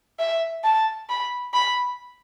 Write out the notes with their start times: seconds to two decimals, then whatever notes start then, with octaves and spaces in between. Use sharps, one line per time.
0.19 E5
0.64 A5
1.09 B5
1.54 B5